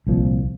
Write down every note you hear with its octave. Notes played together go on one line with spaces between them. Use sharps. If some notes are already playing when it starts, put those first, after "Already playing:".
C2 A#2 F3